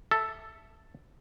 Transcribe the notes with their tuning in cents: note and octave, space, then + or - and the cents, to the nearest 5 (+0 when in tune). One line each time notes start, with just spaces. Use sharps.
A4 +0 E5 +0